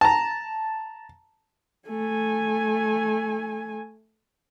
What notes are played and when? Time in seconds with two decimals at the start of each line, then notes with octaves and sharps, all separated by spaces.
0.01 A5 A#5
1.89 A3 G#5